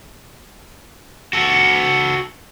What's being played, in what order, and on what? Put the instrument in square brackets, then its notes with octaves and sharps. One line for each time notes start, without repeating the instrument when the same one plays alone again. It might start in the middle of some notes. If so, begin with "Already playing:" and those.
[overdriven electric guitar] F#4 A4